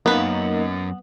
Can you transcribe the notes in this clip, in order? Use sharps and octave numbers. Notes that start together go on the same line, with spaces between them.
F#2 A#3 B3 C#4 D#4 B4